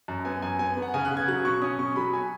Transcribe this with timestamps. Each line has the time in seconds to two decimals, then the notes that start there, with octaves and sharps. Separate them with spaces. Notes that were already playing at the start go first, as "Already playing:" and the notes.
0.08 F#2
0.25 B3 G#5
0.42 F#2 G#5
0.59 B3 G#5
0.77 B3
0.82 F#5
0.94 C#3 G#5
1.05 F#6
1.11 C#3
1.17 G#6
1.28 F#3 F#6
1.45 B2 C#6
1.62 C#4 D#6
1.79 B2 C#6
1.96 F#3 B5
2.13 G#5